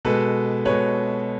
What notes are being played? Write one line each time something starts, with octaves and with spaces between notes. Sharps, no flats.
B2 G#3 A4 B4
B2 G#3 B4 C#5